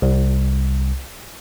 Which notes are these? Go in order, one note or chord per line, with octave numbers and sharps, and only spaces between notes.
C2